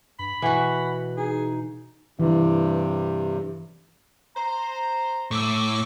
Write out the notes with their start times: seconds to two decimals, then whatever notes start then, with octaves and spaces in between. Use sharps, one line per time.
0.19 G2 B5
0.42 B2 E3 F#4 F#5
1.17 D#4 G#4
2.20 G2 C3 E3
4.36 C5 A#5
5.31 A2 C#6 D6 E6